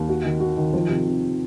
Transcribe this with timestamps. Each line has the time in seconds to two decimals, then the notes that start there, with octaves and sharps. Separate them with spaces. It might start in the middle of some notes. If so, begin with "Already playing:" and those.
Already playing: D#2
0.09 F#4
0.25 D#3
0.40 F#4
0.57 D#3
0.73 F3
0.89 C3
1.06 C3